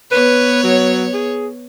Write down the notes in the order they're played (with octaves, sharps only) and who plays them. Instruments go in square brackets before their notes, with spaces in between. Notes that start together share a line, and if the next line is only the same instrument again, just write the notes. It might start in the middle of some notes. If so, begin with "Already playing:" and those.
[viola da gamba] B3 C#5 [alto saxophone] B4
[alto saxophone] F#3
G#4